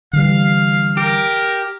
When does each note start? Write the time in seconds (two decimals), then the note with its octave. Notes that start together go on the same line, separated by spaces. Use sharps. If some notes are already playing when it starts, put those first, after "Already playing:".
0.13 D3 E3 G3 F5
0.97 G4 A#4